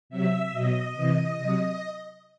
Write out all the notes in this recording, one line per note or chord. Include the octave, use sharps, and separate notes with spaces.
C3 F#3 E5
B2 F#3 D#5
C3 E3
C3 F#3